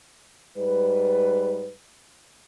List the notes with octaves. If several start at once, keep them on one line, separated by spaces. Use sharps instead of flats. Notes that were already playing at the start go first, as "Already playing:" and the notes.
G#2 G3 B4